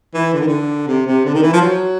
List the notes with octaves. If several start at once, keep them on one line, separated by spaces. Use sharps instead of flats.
E3
D3
D#3
D3
C3
C3
D3
D#3
E3
F3
F#3